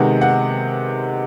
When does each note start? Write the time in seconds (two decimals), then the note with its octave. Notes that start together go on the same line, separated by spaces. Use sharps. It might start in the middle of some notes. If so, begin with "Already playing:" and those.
Already playing: C3 D#3 G#3 B3 F#5
0.21 F#5